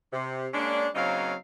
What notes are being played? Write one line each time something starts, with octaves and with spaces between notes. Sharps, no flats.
C3
G#3 A#3 C#4 D4
C#3 F#3 A#3 C4 D#4 F5